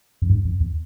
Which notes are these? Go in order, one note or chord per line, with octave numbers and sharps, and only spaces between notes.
F2
G2
F2
E2